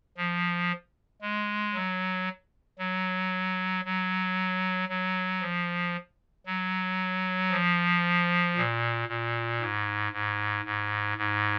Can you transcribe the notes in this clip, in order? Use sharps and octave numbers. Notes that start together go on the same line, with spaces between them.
F3
G#3
F#3
F#3
F#3
F#3
F3
F#3
F3
A#2
A#2
G#2
G#2
G#2
G#2